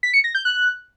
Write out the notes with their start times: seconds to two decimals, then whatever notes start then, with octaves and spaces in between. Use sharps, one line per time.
0.03 B6
0.14 C#7
0.24 A#6
0.35 G6
0.45 F#6